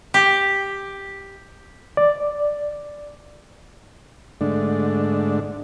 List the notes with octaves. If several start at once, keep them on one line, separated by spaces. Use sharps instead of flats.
G4
D5
G#2 D3 A3 D4